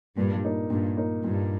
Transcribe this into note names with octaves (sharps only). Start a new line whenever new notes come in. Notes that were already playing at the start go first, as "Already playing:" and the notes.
G2 A#2
A#3 D#4
G2 A#2
A#3 D#4
G2 A#2